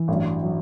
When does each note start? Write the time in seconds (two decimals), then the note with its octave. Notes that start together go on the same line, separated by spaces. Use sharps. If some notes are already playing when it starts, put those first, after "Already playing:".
Already playing: E3
0.08 A1 G2 F#3
0.43 F#3